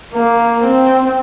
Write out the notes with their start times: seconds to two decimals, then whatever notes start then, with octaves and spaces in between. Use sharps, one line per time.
0.14 A#3
0.63 C4